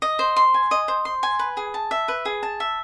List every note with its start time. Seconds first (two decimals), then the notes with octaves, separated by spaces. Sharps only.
0.02 D#5
0.19 C5
0.36 C6
0.54 G#5
0.71 D#5
0.88 C5
1.05 C6
1.23 G#5
1.39 B4
1.57 G#4
1.74 A5
1.91 E5
2.08 B4
2.25 G#4
2.43 A5
2.60 E5